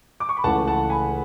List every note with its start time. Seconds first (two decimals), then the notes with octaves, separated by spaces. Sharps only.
0.20 D6
0.29 C#6
0.37 B5
0.44 C#2 C#3 E3 A3 F#5 A5
0.67 F#5 A5
0.90 G#5 B5